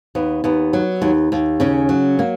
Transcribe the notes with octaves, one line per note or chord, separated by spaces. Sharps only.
D#2 B3
D#2 B3
F#3
D#2
D#2
C#3 C#4
F#3
A#3